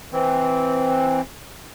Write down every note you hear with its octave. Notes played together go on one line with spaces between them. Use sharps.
E3 C4